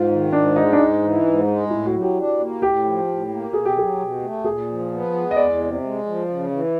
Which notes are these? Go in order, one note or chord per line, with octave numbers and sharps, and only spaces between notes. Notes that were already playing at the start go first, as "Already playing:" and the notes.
Already playing: G#2 F4
D#3
G#2 D4
G#3 D#4
D4
G#2 D#4
E3
G#2
G#3
A2 E4
F#4
F#3
G4
D4
A#3
A2 G4
F3
A2
A#3
B2 G#4
G4
F#3 G#4
B2
A3
A#2 G#4
F3
B3
G#3
D#5
E2 D5
C3
G#3
F3
C#3
E3